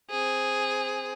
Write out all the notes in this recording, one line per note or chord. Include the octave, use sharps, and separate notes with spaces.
C4 G#4